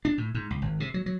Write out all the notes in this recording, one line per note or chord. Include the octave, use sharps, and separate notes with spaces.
D4
A2
G#2
C#2
G#1
C3
F#3
F#3